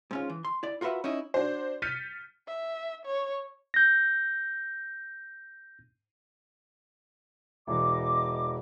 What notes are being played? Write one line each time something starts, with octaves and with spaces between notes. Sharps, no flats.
G#2 C#4 F4
E3
C6
E4 D5
F4 F#4 A#4 B4 E5 F#5
C#4 D#4 E4 D#5
D4 F#4 C5
F6 G6 A6 B6 C#7 D#7
E5
C#5
G6 A#6
E1 E3 D#5 D6